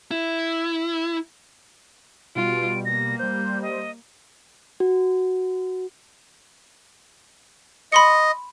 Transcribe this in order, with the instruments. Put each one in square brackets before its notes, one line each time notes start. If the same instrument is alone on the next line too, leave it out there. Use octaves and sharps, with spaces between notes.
[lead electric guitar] E4
[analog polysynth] B2 G3 [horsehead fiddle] F4 [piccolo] D7
[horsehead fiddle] A#3 [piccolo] A#6
[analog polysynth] G3 C5 [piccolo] G6
[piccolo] D#5
[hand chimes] F#4
[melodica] D#5 [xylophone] B5 C6 C#7